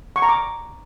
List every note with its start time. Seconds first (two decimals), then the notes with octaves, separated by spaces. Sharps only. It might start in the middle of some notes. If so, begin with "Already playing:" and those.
0.16 C#6
0.22 A#5
0.29 D6